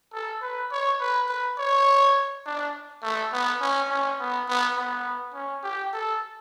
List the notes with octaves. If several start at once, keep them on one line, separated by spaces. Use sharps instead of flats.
A4
B4
C#5
B4
B4
C#5
D4
A3
B3
C#4
C#4
B3
B3
B3
C#4
G4
A4